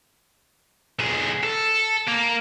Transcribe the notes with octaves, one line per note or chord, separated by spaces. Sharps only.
B1 G#4
A4
A#3